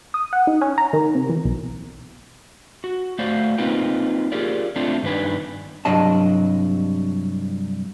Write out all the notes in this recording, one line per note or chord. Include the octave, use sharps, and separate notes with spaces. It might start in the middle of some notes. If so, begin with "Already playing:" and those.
D#6
F#5
D#4
C#4
A#5
D#3
C3
E3
B1
F#4
A3 F#4 C5 D5 F5
A#3 C4 D#4 F4 B4 G5
F4 G4 G#4 A#4 D5
A3 C4 D4 F4
G2 D#3 D4 B4 G#5
C2 G2 F#3 D4 D#5 A5